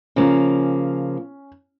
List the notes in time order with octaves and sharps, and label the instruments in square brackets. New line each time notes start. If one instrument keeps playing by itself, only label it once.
[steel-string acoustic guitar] C#3 F3 A#3 [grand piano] C#4